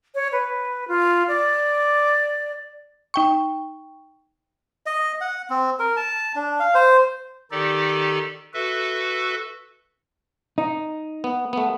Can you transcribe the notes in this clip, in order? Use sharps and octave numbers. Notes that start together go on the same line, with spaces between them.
C#5
B4
F4
D5
D#4 G5 C#6
D#5
F#5
C4
A#4
A5
D4
F5
C5
D#3 D#4 G4 A4 D5
F#4 A4 B4 E5
D#4
B3
A3 B3